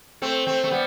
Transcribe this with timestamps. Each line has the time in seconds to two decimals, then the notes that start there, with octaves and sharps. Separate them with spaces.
0.22 A3 C4
0.47 A3 C4
0.64 A3
0.71 G3 B3